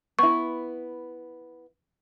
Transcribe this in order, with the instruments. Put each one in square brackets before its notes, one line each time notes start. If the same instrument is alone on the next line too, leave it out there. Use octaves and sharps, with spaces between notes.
[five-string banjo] B3 E4 [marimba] C#6